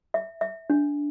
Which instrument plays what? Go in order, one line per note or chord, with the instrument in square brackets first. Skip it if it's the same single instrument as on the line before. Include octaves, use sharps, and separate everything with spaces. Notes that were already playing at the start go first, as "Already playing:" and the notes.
[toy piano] E5
E5
D4